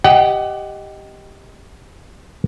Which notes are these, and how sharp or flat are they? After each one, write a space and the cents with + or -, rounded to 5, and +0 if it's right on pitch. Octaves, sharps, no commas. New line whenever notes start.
G4 +0 D#5 +0 F#5 +25